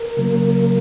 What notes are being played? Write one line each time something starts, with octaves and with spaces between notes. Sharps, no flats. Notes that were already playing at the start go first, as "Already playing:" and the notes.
Already playing: A#4
C#3 F#3 A#3